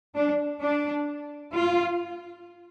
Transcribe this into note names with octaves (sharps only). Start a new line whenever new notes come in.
D4
D4
F4